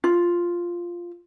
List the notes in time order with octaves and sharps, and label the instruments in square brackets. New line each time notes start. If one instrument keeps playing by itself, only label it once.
[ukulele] F4